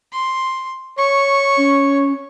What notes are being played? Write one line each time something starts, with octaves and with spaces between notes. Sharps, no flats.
C6
C#5 C#6
C#4